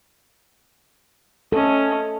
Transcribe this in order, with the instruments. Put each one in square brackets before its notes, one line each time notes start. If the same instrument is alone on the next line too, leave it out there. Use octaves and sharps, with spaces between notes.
[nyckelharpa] C#4 D#5 [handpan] A4